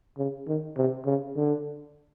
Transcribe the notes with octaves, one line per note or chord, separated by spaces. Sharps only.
C#3
D#3
C3
C#3
D3